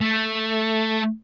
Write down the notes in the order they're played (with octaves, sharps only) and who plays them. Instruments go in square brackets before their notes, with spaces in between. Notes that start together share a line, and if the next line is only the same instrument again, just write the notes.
[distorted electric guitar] A3